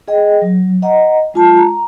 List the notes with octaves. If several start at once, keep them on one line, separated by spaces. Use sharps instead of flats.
G#4 D#5 G5
F#3
D#5 F#5 A#5
G#3 F4 A5
A#5